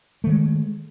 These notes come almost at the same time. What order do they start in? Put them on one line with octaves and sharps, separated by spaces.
A3 D#3 G#3